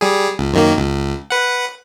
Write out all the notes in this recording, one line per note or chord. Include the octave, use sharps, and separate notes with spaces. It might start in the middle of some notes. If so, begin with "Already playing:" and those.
G3 G#4
C#2
F#2 D#3 A#3
C#2
B4 F#5